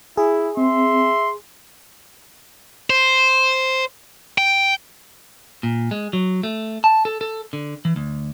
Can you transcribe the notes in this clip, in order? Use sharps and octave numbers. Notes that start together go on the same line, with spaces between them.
E4 G#4
C4 E5 C6
C5
G5
A#2
G#3
F#3
A3
A5
A4
A4
D3
E3
D2